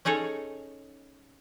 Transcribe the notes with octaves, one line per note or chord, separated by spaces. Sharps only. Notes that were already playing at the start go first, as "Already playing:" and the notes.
C#4 D#4 G#4 A4 C#5